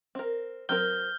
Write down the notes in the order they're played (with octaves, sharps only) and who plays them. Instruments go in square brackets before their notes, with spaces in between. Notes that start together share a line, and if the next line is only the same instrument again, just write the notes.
[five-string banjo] C4 A#4
[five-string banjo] F#3 C4 A#4 [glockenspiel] F6 G6 G7